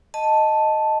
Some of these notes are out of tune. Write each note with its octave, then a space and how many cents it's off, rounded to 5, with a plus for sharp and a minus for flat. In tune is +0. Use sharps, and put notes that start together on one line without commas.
D#5 +0 A5 +0